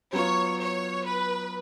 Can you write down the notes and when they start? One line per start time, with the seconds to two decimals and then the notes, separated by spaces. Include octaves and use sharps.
0.13 F#3 B3 F4 C#5
0.59 C#5
1.05 B4